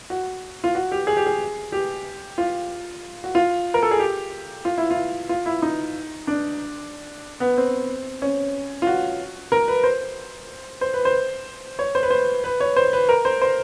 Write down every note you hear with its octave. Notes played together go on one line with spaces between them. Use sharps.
F#4
F4
F#4
G4
G#4
G4
G#4
G4
F4
F#4
F4
A#4
A4
G#4
G4
F4
E4
F4
F4
E4
D#4
D4
B3
C4
C#4
F4
F#4
A#4
B4
C5
C5
B4
C5
C#5
C5
B4
C5
B4
C#5
C5
B4
A#4
C5
C5